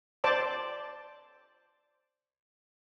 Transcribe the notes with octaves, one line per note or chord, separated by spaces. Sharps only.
C5 D5 A5 D6